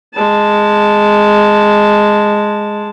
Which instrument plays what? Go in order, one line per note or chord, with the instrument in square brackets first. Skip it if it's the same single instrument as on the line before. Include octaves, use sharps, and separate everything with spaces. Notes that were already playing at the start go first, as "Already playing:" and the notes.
[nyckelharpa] G#3 A5